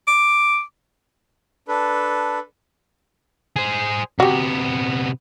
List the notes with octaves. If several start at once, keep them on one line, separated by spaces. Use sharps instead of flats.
D6
D4 A4 B4
G#4 C5
C3 B3 F#4 G4